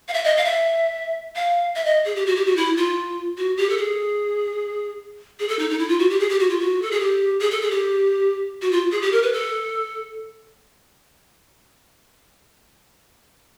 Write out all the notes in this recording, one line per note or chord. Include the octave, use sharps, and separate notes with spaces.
F5
E5
D#5
F5
E5
F5
E5
D#5
G#4
G4
F#4
G4
F#4
E4
F4
F#4
G4
A4
G#4
G#4
A4
D#4
D#4
E4
F4
F#4
G4
G#4
G4
F#4
F4
F#4
A4
G#4
G4
G#4
A4
G#4
G4
F#4
F4
G#4
G4
A#4
B4
A4